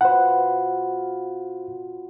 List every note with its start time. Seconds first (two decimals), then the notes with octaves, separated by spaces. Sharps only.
0.01 B2 F4 C5 F#5 B5